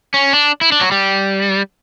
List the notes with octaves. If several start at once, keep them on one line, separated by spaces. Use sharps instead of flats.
C#4
D4
E4
D4
F#3
G3